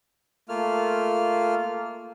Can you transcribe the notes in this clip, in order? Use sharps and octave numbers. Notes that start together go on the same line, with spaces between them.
A3 A#3 F4 F6